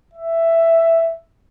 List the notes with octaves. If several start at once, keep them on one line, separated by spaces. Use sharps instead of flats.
E5